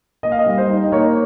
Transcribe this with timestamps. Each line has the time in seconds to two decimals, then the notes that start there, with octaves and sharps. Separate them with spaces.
0.23 A#3 D#5
0.32 F5
0.39 D#5
0.46 G3
0.58 C5
0.69 D#4
0.83 D#5
0.92 A#3 C#5